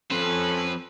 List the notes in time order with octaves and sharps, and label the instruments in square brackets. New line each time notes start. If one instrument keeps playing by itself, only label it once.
[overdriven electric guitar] F3 C4 [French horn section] C#4 A4 [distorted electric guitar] B4